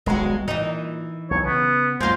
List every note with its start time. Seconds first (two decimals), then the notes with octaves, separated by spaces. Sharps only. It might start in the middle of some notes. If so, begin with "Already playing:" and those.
0.06 D#1 B1 G#3 F#4
0.48 A#2 E3 D#4
1.31 B1 C#5
1.44 C#3 B3
2.00 F#2 G#3 A#3 F4 C5